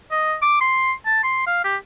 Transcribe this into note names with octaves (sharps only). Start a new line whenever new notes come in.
D#5
D6
C6
A5
C6
F5
G4